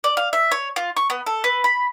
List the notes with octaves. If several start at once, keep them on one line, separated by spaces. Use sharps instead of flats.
D5
F5
E5
C#5
F4
C#6
B3
A4
B4
B5